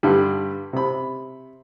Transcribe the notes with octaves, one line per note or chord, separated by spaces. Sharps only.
G2 D3 G3
C3 B5